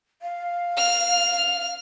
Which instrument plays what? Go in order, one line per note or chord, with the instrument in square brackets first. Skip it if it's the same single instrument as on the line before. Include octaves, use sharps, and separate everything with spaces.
[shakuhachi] F5
[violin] F6